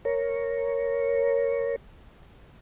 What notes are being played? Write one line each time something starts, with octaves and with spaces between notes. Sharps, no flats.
A#4 C#5